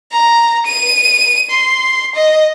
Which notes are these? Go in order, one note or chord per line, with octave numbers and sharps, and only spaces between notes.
A#5
D#7
C6
D#5